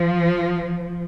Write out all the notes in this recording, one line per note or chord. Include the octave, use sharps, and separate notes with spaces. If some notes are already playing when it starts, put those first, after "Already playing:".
Already playing: F3